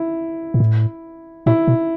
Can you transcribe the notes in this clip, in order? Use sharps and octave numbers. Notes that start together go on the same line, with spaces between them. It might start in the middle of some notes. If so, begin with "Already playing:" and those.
Already playing: E4
A#2
A2
A#2 E4
B2